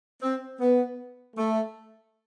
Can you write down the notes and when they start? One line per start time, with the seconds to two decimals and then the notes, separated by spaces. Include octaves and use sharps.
0.22 C4
0.59 B3
1.36 A3